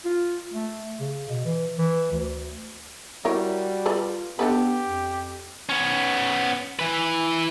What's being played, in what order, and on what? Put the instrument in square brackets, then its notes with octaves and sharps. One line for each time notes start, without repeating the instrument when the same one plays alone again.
[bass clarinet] F4
A3
C#3
B2
E3
E3
D2
[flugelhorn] G3 [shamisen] E4 A#4 C#5 [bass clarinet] F#4
[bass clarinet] F4 [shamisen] A4 B4 D5
[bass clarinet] B3 [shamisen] D4 A4 B4 [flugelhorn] G4
[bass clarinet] F2
[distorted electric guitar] B3 C#4
E3 B4